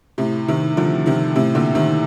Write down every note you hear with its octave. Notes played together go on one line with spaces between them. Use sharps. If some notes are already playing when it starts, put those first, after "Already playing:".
A2 C3
C3 D#3
D3 F3
C3 D#3
A2 C3
A#2 D3
C3 D#3